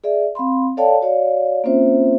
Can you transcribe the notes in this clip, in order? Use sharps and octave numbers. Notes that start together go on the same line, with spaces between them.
G#4 D5 E5
C4 F5 B5 C6
A4 C#5 D5 F5 G5 A5
F#4 C#5 D5 F5
A#3 C4 C#4 F4 C5 E5